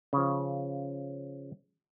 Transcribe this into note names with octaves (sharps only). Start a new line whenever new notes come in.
C#3 F3